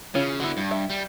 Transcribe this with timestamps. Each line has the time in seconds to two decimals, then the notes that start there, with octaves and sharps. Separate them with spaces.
0.15 C#3 E3 C#4 F4
0.40 D3 B3 E4 F#4
0.57 G2
0.71 E5
0.90 G3